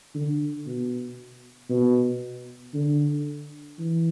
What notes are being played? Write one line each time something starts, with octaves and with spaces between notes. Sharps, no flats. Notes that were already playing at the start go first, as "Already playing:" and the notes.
D3
B2
B2
D3
E3